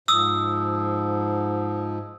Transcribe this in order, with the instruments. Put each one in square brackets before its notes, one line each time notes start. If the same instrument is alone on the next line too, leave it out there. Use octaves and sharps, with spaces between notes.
[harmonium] G#2 F3 [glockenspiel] D#6 E6